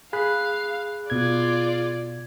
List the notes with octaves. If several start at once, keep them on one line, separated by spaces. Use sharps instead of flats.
G#4 F5 B5 F#6
B2 F4 D5 G#6